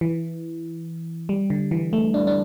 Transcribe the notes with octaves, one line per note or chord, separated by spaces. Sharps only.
E3
G3
D3
E3
A3
D4
D4